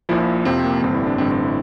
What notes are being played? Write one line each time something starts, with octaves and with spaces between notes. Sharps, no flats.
A#1 A#2 F3 E4
E4
F2 C3 F3 C4
A#3
A1 G2 D3 C4
E4
D4
A1 G2 D3 C4
C4
E4